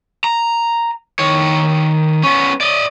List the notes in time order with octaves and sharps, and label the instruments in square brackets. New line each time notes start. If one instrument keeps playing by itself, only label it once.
[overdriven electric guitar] A#5
D#3 C#5
B3 C#4
D5 D#5